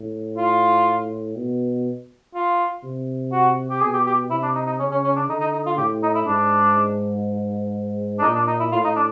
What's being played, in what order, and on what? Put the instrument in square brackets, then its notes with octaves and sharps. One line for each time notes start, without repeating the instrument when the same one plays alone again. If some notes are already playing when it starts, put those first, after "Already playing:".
Already playing: [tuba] A2
[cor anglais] F4
[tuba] B2
[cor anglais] F4
[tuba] C3
[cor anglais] F#4
G4
[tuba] B2 [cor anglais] G#4
[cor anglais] G4
G4
[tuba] C3 [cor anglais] E4
[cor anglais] D4
D#4
D#4
[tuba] C#3 [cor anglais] C#4
[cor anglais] C#4
C#4
D4
[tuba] D3 [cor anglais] D#4
[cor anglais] D#4
D#4
F4
[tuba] A2 [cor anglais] G4
[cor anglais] D#4
E4
[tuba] G#2 [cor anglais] D4
[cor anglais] D4
[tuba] A#2 [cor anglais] D#4
[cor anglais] D4
D#4
E4
[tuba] A2 [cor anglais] F4
[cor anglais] D#4
D4